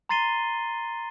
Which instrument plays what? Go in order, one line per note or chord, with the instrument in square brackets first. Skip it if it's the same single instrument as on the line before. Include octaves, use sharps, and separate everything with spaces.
[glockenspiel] A#5 C6 A6 C7 D#7 G7